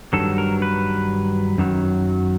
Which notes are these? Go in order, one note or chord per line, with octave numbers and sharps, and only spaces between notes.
G2 D#3 F#3 A4
A#4
B4
F#2 D#3 F#3